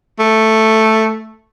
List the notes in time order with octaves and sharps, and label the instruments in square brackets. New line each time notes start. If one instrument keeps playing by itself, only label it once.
[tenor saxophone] A3